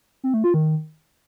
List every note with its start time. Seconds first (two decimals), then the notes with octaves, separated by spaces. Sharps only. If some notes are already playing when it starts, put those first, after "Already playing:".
0.24 C4
0.34 A3
0.44 F4
0.54 D#3